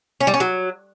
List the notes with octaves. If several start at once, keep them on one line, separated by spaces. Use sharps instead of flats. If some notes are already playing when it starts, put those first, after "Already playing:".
C#4
G3
C#4
F#3